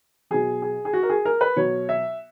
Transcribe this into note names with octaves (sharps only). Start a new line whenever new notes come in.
B2 F#3 G#4
G#4
G#4
F#4
A#4
G#4
A#4
B4
B2 F#3 C#5
E5